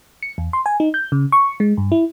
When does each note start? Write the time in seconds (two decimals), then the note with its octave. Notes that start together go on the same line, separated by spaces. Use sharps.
0.23 C#7
0.38 E2
0.53 C6
0.66 G#5
0.80 D#4
0.94 G6
1.12 C#3
1.32 C#6
1.60 G#3
1.78 G2
1.92 E4